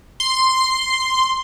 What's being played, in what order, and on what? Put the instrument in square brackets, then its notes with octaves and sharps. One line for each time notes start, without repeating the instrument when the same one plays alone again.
[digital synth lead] C6